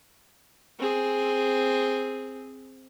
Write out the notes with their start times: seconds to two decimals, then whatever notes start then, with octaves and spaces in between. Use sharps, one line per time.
0.79 C4 G#4